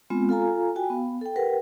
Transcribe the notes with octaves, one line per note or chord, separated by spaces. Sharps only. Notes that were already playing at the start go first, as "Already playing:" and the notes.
G#3 B3 C4 F4
F4 A4 F5 G#5 A#5
F#4 G5 G#5
B3 F5
A4 G5
G4 A#4 B4 F#5 G5